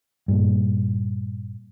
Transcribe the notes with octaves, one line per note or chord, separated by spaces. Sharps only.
G2 A#2